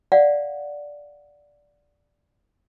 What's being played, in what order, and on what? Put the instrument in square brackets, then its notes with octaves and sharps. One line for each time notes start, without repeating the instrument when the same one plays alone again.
[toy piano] D5 F5 F#5